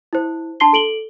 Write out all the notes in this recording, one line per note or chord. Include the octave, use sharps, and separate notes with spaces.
E4 C5
D4 A5 C6 C7 G7
A4 D7 F#7 G7